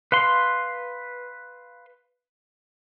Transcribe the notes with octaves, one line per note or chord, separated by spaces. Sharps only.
B4 F5 C6